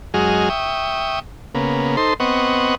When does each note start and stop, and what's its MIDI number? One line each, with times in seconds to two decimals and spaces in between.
0.14 0.49 42
0.14 0.49 56
0.14 0.49 66
0.14 0.49 68
0.14 0.49 75
0.14 0.49 89
0.49 1.19 76
0.49 1.19 79
0.49 1.19 85
0.49 1.19 87
1.55 1.96 49
1.55 1.96 58
1.55 1.96 59
1.97 2.14 63
1.97 2.14 69
1.97 2.14 72
1.97 2.14 84
2.20 2.75 59
2.20 2.75 60
2.20 2.75 75
2.20 2.75 78
2.20 2.75 85